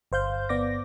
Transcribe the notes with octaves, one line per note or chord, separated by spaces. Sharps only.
G1 C5 F5 G6
G1 B3 D5 D6 A#6